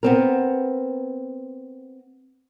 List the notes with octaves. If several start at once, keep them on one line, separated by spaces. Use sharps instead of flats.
B3 C4 A#4